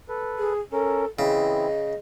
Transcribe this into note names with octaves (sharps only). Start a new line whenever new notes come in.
A4 B4
G#4
C#4 A4 A#4
C#3 E3 C4 E4 D#5